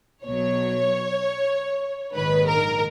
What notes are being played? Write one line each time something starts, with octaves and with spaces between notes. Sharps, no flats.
B1 B2 F#3 C#5
A#1 G#2 D#3 B4
A#4